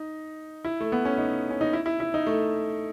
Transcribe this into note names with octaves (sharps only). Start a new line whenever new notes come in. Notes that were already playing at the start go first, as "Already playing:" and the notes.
Already playing: D#4
E4
A3
B3
C#4
D#4
C#4
D#4
E4
E4
E4
D#4
A3